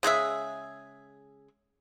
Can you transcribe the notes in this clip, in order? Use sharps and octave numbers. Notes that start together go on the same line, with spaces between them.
C#3 G#3 G#4 E5